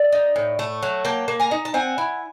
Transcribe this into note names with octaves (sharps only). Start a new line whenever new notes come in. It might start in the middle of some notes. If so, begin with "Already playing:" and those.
Already playing: D5 E5
D#4
A2
A3
F#3
A#3 G5 A5
A#3
G#5 A#5
D#4
A5
C4 F#5 G#5
E4